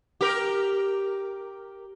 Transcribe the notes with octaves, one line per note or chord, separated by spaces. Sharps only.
G4 A#4